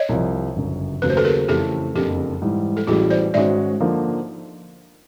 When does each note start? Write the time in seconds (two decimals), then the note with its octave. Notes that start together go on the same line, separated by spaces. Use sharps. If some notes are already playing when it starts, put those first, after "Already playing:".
Already playing: C#5 D#5
0.09 C2 C3 F3
0.56 G1 F#2 C#3
1.02 D#2 C#3 F#3 A3 B4
1.10 C5
1.17 A4 B4
1.25 G#4 A#4
1.48 F2 C#3 E3 A3 C4 G4 A4
1.95 F#1 F2 D3 G4 A4
2.42 G#2 E3 G3
2.77 A4
2.87 A1 A2 E3 G3 F#4 G#4
3.10 C5 D5
3.34 G#2 D#3 G#3 C#4 F#4 D5 E5
3.81 D3 F3 A#3 D#4